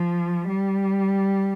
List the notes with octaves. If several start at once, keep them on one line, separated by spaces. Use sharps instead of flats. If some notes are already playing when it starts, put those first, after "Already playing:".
Already playing: F3
G3